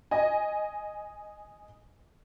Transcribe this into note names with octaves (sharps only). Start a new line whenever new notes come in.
D#5 G#5